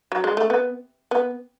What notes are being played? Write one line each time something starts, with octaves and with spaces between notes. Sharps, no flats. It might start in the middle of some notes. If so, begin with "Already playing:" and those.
F#3
G#3
A3
B3
B3